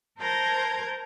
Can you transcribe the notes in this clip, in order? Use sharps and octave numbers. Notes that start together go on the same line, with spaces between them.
A#4 C5 A5 A#5 G6 G#6